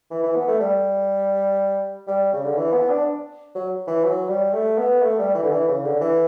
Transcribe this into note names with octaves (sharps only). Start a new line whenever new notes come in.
E3
E3
B3
A3
G3
G3
C#3
D3
E3
B3
D4
F#3
E3
F#3
G3
A3
B3
A3
G3
E3
D3
E3
C#3
D3
E3